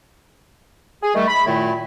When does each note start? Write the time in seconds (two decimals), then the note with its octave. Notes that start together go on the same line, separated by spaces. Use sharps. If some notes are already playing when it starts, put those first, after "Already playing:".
1.03 G#4
1.14 D#3 G3 A3
1.28 B5
1.47 F#2 A#2 D#3 A3 E4